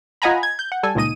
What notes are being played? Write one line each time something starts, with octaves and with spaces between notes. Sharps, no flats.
F4 D#5 F#5 G#5 A#5 B5
G#6
G6
F#5
G3 A4 G#5
C#2 A#2 D#3 D#5 D#7